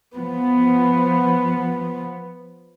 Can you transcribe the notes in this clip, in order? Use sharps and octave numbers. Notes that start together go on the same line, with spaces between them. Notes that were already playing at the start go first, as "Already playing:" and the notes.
F3 B3